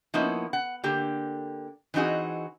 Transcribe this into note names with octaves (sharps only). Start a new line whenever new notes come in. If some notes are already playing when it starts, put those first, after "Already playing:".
F3 A#3 B3 C#4 D#4 E4
F#5
D3 A#3 G4
E3 C4 D#4 F#4 G#4